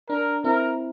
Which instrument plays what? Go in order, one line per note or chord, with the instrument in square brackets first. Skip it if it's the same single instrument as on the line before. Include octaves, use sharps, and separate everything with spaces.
[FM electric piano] D4 [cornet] A#4
[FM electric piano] C4 E4 [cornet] A#4